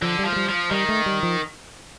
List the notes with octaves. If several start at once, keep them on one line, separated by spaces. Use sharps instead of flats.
D3 F3
G3
F3
A3
G3
F3
D#3 G3
A3
G3
F3